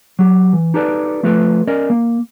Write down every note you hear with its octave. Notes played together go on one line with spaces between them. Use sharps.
F#3 G4
E3
D#4 G4 A4 B4 D5
F3 A3 F4 A4 B4
C#4 A#4 D5 D#5
A#3